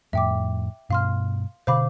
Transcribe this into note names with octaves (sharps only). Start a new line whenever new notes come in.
F2 A2 E5 G5 D6
G2 B2 F5 C6 F6
B2 D3 C5 F5 B5 D6